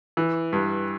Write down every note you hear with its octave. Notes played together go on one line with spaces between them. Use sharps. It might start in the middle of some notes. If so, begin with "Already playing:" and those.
E3
G2